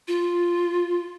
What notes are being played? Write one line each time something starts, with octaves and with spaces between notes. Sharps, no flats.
F4